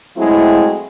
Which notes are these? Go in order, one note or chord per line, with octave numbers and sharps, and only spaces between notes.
F#3 G#3 A3 C4 E4